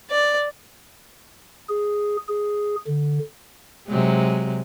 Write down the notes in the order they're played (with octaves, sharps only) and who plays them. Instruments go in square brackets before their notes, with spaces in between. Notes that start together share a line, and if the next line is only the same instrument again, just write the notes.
[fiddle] D5
[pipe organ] G#4
G#4
D3
[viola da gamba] C3 F#3 G#3